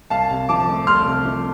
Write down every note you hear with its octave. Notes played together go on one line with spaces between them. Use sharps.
C2 F5 A5
C3
F3 A5 D6
A3
C2 C6 F6
C3
F3